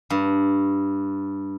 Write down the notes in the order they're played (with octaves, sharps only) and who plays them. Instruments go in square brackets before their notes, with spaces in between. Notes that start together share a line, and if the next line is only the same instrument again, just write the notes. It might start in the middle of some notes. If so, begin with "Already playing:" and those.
[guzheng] G2